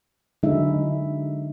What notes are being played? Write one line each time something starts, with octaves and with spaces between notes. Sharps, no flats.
D3 F#3 G#3 D#4 E4 E5